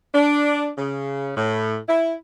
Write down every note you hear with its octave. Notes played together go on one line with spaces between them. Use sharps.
D4
C#3
A2
E4